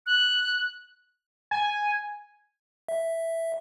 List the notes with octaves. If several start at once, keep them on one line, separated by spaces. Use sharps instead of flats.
F#6
G#5
E5